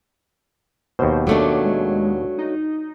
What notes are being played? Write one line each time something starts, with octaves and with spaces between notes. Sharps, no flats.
D#2 B2 C5
F#3 A3 D4 D6
G#3
D#4